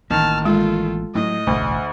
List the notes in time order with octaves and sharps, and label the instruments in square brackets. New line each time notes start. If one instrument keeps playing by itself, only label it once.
[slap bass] A1 E3 A#3 [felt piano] D#3 [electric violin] A5 F6
[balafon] G#3 [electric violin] F4 A4
[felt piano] A2 [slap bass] F#3 [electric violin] D#5
[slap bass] E1 A1 [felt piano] D2